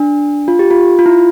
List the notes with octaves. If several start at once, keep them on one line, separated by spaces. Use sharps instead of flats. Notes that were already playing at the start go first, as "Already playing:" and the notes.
Already playing: D4
F4
G4
F4
F4
E4